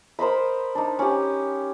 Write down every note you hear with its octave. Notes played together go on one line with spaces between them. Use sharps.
A#4 C5 D#5 B5
D4 D#4
C#4 G4